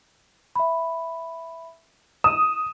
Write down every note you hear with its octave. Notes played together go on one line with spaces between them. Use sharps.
E5 B5
D#6 D#7 E7